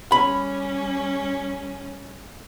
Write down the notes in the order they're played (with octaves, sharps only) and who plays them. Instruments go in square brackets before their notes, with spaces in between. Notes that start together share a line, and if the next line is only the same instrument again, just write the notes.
[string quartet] G3 C#4 [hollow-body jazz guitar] B5